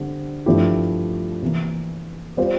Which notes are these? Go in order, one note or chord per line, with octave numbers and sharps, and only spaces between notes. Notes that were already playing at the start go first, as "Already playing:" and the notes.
Already playing: D3 G3 C4
G2 F3 A3 E4 G4
C3 E3 A#3
G3 C4 F4 C5